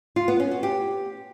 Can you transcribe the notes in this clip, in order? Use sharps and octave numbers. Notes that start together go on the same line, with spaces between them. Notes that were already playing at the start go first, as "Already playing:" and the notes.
F4
B3
C#4
F#4
G4